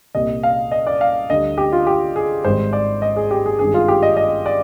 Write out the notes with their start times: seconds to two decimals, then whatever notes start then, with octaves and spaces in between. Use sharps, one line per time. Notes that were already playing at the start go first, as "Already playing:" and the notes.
0.15 C2 A#2 G3 D#5
0.43 F5
0.72 D#5
0.87 D5
1.01 F5
1.30 D2 D3 G3 D#5
1.58 G4
1.72 F4
1.87 G4
2.16 G#4
2.45 G#1 G#2 D#3 G3 C5
2.73 D5
3.02 D#5
3.16 G#4
3.31 G4
3.46 G#4
3.59 G#1 G2 D#3 G3 G#4
3.74 F4
3.88 G4
4.03 D#5
4.17 D#5
4.46 D5